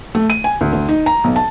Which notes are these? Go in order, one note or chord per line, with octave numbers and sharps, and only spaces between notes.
A3
D#7
G#5
D2
D2
D#4
A#5
B1
A5